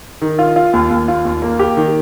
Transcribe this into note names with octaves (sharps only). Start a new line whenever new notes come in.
D#3
F4
F4
D#2
D#2
F4
D#2
A#3
G4
D#3